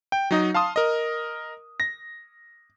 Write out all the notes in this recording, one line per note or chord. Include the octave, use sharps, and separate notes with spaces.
G5
F#3 D#4 D#5
F5 A5 C6 D#6
A#4 D#5
A#6